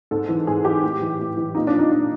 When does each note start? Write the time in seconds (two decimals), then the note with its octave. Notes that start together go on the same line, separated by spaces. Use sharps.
0.11 G#2 A4
0.29 E3
0.47 G#2 G#4
0.65 E3 G4
0.83 A2
1.01 E3
1.19 A2
1.37 E3
1.55 A#2 D#4
1.67 D4
1.73 F3
1.79 D#4
1.91 A#2 D4